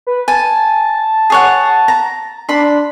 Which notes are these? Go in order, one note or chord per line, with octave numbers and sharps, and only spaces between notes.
B4
G#5 A5
G#4 C#5 F#5
A#5
D4 B5 C6